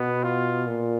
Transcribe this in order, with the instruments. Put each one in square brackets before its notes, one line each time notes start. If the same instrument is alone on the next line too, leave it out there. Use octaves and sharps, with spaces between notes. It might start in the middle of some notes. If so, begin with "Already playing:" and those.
Already playing: [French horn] B2 [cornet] B3
[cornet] F4
[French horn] A#2